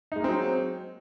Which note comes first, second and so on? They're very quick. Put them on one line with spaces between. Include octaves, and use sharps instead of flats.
D#4 G#3 A#3 C4 F#3